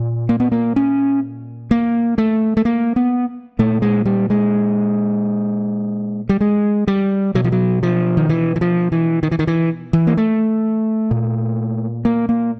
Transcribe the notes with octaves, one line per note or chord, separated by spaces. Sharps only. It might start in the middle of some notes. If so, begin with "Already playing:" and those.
Already playing: A#2
A#3
B3
A#3
C#4
A#3
A3
A3
A#3
B3
A#2 A3
G#3
G3
G#3
G3
G#3
G3
B2 F#3
F3
F#3
F3
D#3
E3
E3
F3
E3
D#3
E3
D#3
E3
E3
A#3
A3
A#2
A#3
A#3